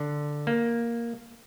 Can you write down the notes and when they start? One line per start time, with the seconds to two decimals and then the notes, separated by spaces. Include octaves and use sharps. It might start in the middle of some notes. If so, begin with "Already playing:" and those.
Already playing: D3
0.47 A#3